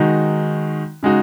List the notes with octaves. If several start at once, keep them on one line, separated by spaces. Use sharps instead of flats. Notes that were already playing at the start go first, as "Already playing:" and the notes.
Already playing: D#3 G#3 D#4 F#4
C#3 G#3 D#4 F#4